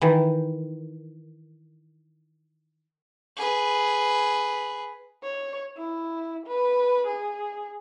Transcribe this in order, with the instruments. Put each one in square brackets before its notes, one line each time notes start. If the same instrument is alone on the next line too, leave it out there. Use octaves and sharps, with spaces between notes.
[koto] D#3 E3
[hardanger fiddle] G#4 B4
[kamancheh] C#5
E4
B4
G#4